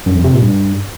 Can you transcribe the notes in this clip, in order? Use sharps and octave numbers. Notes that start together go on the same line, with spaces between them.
F#2
F2
C3
A#2
G2